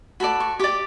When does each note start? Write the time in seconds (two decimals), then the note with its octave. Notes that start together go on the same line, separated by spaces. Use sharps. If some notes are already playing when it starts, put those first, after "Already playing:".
0.20 F#4 A4 D5 B5
0.40 C#6
0.59 G4 D5 D6